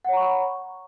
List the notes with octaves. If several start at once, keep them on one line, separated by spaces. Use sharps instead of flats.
C#5 F#5 A#5 B5 C#6